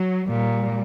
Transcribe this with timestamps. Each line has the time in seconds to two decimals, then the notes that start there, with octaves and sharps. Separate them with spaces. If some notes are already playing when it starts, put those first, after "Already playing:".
Already playing: F#3
0.28 A#2 G3